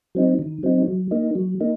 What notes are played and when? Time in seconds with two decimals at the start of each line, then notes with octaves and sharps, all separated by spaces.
0.15 F#3 C4 D#4
0.39 D#3
0.63 F#3 C4 D#4
0.88 F#3
1.11 A#3 D#4
1.35 F#3
1.61 A#3 D#4